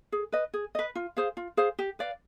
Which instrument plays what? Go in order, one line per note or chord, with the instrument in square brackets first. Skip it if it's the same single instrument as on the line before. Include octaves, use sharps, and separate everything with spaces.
[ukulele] G#4
B4 D#5
G#4
B4 D#5
F4
G#4 C5 F5
F4
G#4 C5 F5
G4
B4 D5 F5